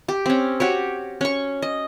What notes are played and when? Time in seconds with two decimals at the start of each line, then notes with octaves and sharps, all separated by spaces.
0.08 G4
0.26 C4 C#4
0.60 F#4 G4 C#5
1.21 C#4 C#6
1.62 D#5